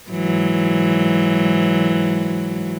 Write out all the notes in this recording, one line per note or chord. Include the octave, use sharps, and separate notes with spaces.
G#2 E3 F#3